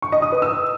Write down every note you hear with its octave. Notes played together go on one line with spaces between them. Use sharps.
C#6
D#5
D#6
B4
E6